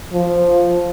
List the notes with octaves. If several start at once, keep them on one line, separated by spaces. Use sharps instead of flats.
F3